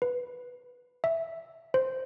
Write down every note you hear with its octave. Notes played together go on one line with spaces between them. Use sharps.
B4
E5
C5